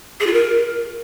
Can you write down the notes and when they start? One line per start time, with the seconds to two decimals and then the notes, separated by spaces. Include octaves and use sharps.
0.20 G#4
0.27 F4
0.33 A#4